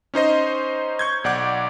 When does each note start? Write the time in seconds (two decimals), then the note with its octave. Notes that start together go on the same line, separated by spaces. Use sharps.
0.14 C#4 D#4 C5 D#5
0.99 C#6 G6 G#6
1.24 B1 D5 F#5 D6